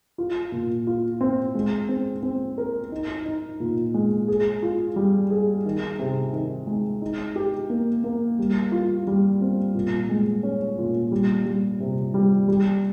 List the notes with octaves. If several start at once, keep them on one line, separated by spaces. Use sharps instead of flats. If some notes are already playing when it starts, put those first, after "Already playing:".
F4
A#2
F4
C4
G#3
C4
C4
A#4
D#4
D#4
A#2
G#3
G#4
F4
G3
G#4
D#3
C3
D#3
G#3
D#4
G4
A#3
A#3
G3
F4
G3
C4
A#2
G#3
C#4
A#2
G3
G3
C3
G3
G3